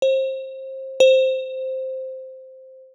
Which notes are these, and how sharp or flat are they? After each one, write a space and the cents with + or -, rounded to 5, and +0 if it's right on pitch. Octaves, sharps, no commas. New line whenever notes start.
C5 +25
C5 +0